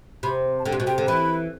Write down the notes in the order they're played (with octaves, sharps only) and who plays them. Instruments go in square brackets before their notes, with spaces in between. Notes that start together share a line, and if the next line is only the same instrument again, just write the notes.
[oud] C3 [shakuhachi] B5
[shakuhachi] A5
[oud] D3 [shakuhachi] G5
[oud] C3
B2
[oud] C3 [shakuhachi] G5
[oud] D3
[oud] E3 [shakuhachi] B5